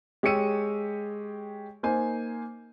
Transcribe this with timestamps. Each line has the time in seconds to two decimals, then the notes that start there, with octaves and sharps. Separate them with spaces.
0.23 G#3 G4 C#5 E6 C#7 D#7
1.83 A#3 D#4 C5 G#5